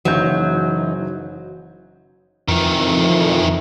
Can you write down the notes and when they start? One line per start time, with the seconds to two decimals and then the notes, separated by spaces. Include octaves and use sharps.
0.05 F#1 E3 F#3 D#4 G6
2.48 F2 D#3 E3